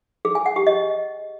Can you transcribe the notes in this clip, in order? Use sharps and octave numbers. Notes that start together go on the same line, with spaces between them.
G#4
G#5
F#5
G4
D#5